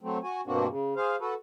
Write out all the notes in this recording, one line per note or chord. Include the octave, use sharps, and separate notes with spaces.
F#3 A3 C4
F#4 G#5
G2 B2 A#3 C4 D4 F#4
C#3
G#4 C5 F5
F#4 A4 B4